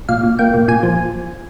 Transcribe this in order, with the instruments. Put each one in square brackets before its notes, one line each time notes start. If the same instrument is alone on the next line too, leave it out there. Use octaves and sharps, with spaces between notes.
[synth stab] A#2 F5
A#2
A#3 G5
A#2
A#2 G#5
F3